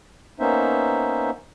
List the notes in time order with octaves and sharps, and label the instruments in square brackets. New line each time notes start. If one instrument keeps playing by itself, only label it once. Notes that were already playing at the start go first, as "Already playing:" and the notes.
[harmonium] A#3 B3 C#4 D#4 C5 E5